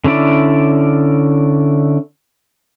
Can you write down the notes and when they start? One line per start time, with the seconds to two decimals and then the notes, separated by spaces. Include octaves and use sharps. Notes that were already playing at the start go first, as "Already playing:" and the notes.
0.04 D3 C#4 E4 D5